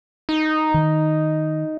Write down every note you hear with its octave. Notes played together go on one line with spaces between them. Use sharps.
D#4
D#3